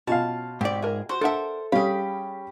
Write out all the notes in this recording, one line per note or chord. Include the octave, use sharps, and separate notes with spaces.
B2 C#4 F4 F5 A5
G#2 C4 G4 D5 C#6
G#4 A#4 E5
F#4 C5
D4 A4 A#4 E5 F#5
G3 C#4 G4 G#4 F5 B5